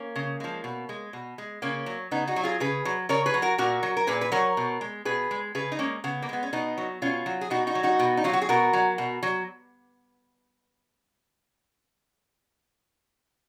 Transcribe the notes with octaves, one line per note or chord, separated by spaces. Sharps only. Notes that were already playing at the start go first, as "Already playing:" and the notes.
Already playing: A#3 C#4
C#3
F3 G#3
B2
G#3
B2
G#3
C#3 A#3 C#4
F#3
C#3 B3 D#4
D#4 F#4
F#3
F4 G#4
C#3 G#4 B4
F#3
C#3 A#4 C#5
G#4 B4
F#3
F#4 A#4
A#2 F#4 A#4
F#3
A#4
A#2 G#4 B4
B4
F#3 A#4 C#5
B2
G#3
B2 G#4 B4
G#3
C#3 G#4 B4
D#4
G#3 A#3 C#4
C#3 B3
A#3
G#3 B3
C#4
B2 B3 D#4
F#3
B2 C#4 F4
F#3
G#4
B2 D#4 F#4
D#4 F#4
F#3
D#4 F#4
B2
D#4
F#3 F4
F#4
G#4
B2 F#4 A#4
F#3
B2
F#3